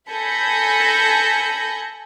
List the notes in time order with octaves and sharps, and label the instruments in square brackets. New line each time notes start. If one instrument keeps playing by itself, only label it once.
[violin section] A4 G#5 B5 G6 A#6 C#7